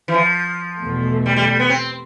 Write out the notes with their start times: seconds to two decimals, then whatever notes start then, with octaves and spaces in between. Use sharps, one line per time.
0.08 E3
0.14 F3
0.81 E2 B2 A3
1.26 G3
1.36 G3
1.47 G3
1.59 B3
1.69 C4